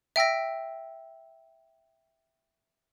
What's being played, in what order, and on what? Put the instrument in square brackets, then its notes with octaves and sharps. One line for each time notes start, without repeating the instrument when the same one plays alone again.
[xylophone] E5 G5 E6 A#6